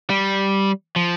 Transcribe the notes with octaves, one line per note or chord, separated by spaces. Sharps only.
G3
F3